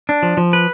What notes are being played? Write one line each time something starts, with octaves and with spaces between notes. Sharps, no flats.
D4
F3
F3
B4